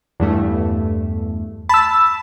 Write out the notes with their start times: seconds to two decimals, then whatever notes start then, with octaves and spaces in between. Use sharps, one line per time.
0.20 E2 G2 A3
1.69 A5 B5 E6